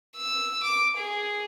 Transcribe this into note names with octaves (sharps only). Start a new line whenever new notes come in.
E6
D6
G#4